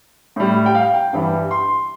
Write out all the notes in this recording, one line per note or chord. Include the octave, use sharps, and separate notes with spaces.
A2 G3
G5
F5
G5
G2 E3 G3
C6